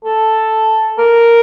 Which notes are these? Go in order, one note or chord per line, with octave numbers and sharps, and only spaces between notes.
A4
A#4